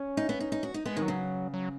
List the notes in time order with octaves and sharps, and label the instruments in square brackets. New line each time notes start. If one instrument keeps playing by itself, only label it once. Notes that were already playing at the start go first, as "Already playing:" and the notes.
Already playing: [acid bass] C#4
[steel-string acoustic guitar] D#4
B3
D#4
D#4
F#4
D#4
[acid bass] G#3 [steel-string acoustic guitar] B3
[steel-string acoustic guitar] D#3
[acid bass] F#3
[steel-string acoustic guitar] C#3
[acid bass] F#3